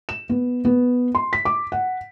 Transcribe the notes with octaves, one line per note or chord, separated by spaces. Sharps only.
E7
B3
B3
C6
B6
D6
F#5